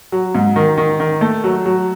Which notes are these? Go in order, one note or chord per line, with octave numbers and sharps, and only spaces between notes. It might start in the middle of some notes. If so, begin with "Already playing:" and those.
F#3
G#2
D#3
D#3
D#3
A3
F#3
F#3